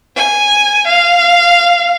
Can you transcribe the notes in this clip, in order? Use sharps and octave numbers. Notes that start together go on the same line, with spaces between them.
G#5
F5